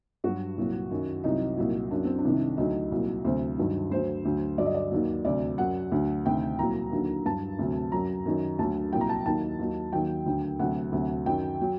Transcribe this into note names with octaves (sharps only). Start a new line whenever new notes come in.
G2 F#3 F#4
C2 A#2 F#3
F#2 D#3 F#3
C2 C3 F#3 D#4
C2 A#2 F#3
F#2 F#3 D4
C4
D4
C2 C3 D#3
D2 D3 F#3 D#4
C2 A#2 F#3
D2 C3 F#3 C5
G2 D#3 F#3
D2 D3 F#3 C5
D2 D3 F#3
G2 D3 F#3 D5
D#5
D5
D#2 D#3 F#3
D2 C3 F#3 D5
F#2 F#3 F#5
D2 D3 F#3
D2 C3 D#3 G5
C2 A#2 F#3 A#5
D#2 D3 F#3
G2 F#3 A5
D2 C3 F#3
F#2 F#3 A#5
F#2 D#3 F#3
D2 D3 F#3 A5
C2 A#2 F#3 G5
A#5
A5
D#2 D#3 F#3 A5
D#2 D#3 F#3
D#2 D#3 F#3 G5
D2 D3 F#3
D2 C3 F#3 F#5
D2 C3 F#3
F#2 D#3 F#3 G5
F#3